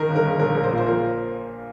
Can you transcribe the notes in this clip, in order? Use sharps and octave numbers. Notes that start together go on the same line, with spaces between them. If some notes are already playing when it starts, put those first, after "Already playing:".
Already playing: D#3 A#4
G1
A#4
G1
A#1 A#4
A#1
C5
A#2
C5
F3 A#4